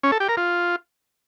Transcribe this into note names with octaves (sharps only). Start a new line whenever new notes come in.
C#4
A4
G4
A#4
F4